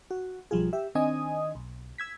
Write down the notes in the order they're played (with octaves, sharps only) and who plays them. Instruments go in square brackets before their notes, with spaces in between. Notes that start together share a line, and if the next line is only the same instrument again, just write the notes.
[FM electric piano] F#4
B1 F3 G3 F4 G#4
G4 E5
D#3 C4 D4 D#5 G#5 D#6
B1
E6 G#6 B6